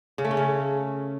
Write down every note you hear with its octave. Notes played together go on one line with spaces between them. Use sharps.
C#3
A3
C#4
C#3